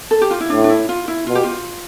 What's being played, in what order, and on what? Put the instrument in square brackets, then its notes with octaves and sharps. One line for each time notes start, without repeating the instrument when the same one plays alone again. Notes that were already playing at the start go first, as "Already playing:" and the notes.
[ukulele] A4
G4
F4
E4
[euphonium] A2 [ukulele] D4
[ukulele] D4
E4
F4
E4
[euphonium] B2 [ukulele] F4
[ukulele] G4
F4